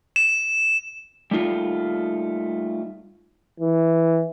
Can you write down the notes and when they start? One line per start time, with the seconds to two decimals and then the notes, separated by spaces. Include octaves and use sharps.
0.16 E7
1.31 G3 A3 D#4 F4
3.60 E3